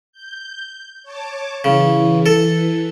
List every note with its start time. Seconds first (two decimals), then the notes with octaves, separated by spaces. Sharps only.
0.12 G6
1.03 C#5 A5 D6
1.64 C#3 E3
2.26 A4